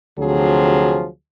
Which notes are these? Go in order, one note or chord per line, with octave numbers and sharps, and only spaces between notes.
D2 C3 F3 F#3 G#4